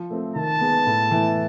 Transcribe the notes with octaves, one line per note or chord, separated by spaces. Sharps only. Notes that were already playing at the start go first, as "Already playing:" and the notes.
Already playing: F3
A3 C4
D#3 A5
G#3 B3
A2
E3 A3